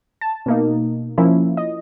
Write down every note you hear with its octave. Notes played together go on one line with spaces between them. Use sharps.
A5
B2 A#3 D#4
F3 A#3 C#4 E4
D#5